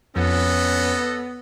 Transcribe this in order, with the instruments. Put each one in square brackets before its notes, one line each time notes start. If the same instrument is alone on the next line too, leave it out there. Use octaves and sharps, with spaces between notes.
[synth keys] F2 [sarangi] B3 [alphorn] C#4 [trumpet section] A4 B4 D#5